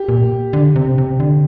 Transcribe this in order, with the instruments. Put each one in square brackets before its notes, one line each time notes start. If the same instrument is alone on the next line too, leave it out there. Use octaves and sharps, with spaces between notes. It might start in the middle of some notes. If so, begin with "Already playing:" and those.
Already playing: [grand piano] G4
[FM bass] A#2
D3
C3
C3
D3